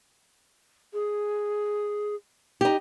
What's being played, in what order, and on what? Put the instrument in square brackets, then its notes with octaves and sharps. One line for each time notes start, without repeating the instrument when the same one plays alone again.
[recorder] G#4
[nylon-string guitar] D#4 G4